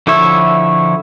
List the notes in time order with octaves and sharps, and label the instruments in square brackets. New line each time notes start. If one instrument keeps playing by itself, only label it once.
[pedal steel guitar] D3 F3 E4 C#5 E5